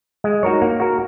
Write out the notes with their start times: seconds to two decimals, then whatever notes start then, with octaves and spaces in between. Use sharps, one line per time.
0.24 G#3
0.43 D#4 F#4 A#4 C#5
0.62 A#3
0.80 F#4 A#4